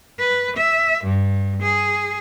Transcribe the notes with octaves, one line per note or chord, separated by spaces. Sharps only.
B4
E5
G2
G#4